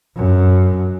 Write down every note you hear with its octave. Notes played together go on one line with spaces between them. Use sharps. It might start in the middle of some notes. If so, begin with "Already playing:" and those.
F#2